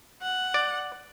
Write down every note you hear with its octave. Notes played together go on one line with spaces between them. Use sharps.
F#5
D5